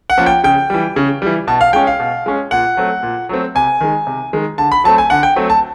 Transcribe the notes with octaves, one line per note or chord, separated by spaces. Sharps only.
F#5
F3 A#3 C#4
G5
C#3 G5
E3 G3
C#3
E3 G3
B2 A5
F5
G#3 C#4 G5
F5
B2
G#3 C#4
A#2 F#5
F#3 A3 C4
A#2
F#3 A3 C4
C3 G#5
D#3 G#3
C3
D#3 G#3
D3 A5
B5
F#3 A3 C4 A5
G#5
D3 F#5
G5
F#3 A3 C4
A5